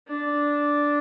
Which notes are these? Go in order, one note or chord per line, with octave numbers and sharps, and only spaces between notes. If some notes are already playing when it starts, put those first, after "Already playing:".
D4